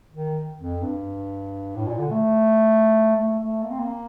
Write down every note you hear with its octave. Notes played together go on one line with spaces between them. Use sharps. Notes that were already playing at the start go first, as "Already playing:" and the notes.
D#3
F2
G2
A2
A#2
D3
A3
A3
A3
A#3
C4
A#3